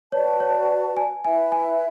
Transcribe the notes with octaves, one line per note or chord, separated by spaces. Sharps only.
F#4 B4 C#5 D5 A5
C#5
G#5
E4 B4 E5 G#5
G#5